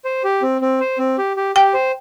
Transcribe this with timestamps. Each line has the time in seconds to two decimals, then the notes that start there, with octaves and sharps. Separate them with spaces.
0.05 C5
0.24 G4
0.42 C4
0.61 C4
0.80 C5
0.99 C4
1.18 G4
1.37 G4
1.55 G4 G5
1.74 C5